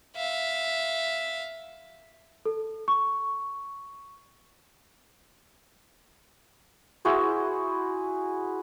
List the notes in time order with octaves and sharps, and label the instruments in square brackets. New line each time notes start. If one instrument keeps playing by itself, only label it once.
[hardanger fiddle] E5 F5
[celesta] A4
C#6
[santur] E4 F#4 G#4 C5